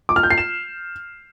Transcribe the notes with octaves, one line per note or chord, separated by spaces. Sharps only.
D6
F6
G6
C7
E7